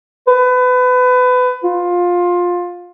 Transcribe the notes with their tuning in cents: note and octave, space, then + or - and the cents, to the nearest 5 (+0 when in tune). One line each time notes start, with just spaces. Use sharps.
B4 +25
F4 +15